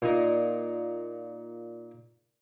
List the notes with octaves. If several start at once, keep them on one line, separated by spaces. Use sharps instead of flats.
A#2 D#4